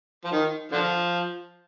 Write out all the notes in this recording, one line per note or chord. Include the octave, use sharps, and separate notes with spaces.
F3
D#3
D3 F3